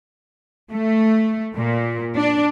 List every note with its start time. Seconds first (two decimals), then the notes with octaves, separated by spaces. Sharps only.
0.72 A3
1.57 A#2
2.16 D4